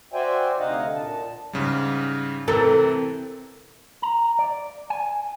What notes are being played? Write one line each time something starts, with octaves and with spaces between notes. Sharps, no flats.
F#4 C5 D5 E5 G5 G#5
D2 C3 D#4 D#5 F5 F#5
A#2 A5
G#2 C#3 G3
C3 E3 C4 A4 A#4
A#5
D5
G#5